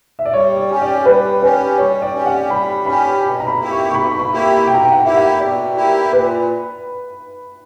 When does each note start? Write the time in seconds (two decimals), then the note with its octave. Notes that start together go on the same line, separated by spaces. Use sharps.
0.19 E5
0.25 D5
0.33 G3 C#5
0.57 D5
0.69 C#4 G4
0.82 D5
1.06 G3 B4
1.42 C#4 G4 B4
1.78 G3 C#5
2.02 D5
2.14 C#4 G4
2.26 F#5
2.50 G3 B5
2.86 C#4 G4 B5
3.22 B2
3.40 A#5
3.47 B5
3.59 A#3 E4 G4
3.71 C#6
3.91 C#6
3.94 B2 B5
4.14 C#6
4.19 B5
4.31 A#3 E4 G4
4.67 B2 G5
4.74 A#5
4.82 G5
4.91 F#5
5.03 A#3 E4 G4 E5
5.16 F#5
5.40 B2 D5
5.76 A#3 E4 G4
6.12 A#2 B4